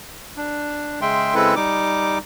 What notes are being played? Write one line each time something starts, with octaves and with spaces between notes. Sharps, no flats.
D4
C#3 G#3 E5 G5 C6
C#3 G#3 C4 E4 A4 B4
G3 D#4 D6